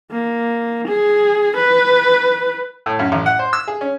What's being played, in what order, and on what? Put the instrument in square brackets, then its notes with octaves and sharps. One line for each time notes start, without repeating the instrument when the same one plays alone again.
[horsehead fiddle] A#3
G#4
B4
[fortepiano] A2
F#2
A1
F#5
C5
E6
G#4
C#4